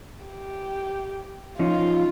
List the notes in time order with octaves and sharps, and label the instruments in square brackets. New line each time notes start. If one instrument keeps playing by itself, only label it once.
[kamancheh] G4
[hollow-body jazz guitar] F3 C#4 D#4 [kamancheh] F4